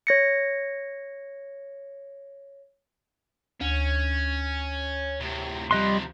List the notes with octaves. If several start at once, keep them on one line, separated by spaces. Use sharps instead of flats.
C#5 A#6 C#7
D2 C#4
A2 C3
C3 F3 G3 D#5 C6 F#6